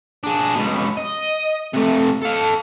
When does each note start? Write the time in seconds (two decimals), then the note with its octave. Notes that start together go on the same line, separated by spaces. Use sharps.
0.23 D4 G#4
0.55 C#2 B2
0.97 D#5
1.73 C3 A3
2.22 A4 F5